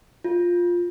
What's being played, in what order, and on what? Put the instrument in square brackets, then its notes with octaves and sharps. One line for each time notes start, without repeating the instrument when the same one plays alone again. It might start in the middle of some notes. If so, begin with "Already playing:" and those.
[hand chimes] F4